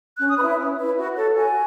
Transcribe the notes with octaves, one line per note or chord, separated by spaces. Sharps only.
C#4 F#6
D#6
E4 B4 B5
E5
C#4
E4 B4
F#4
A4 C#5
F#4 G#5